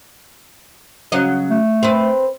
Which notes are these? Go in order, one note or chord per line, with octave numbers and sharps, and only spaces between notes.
C#3 F#3 D#5
A3
C4 B4